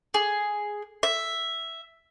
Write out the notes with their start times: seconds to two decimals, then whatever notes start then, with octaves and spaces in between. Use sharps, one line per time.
0.14 G#4
1.03 E5